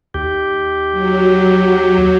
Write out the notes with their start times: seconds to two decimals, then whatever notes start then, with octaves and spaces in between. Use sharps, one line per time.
0.14 D#2 G4
0.92 F#3